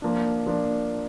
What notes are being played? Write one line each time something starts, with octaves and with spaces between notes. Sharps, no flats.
F3 A#3 D4
F3 A#3 D4